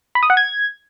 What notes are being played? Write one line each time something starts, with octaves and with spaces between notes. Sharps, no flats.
B5
D#6
F#5
G#6